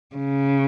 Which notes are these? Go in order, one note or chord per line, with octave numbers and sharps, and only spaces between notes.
C#3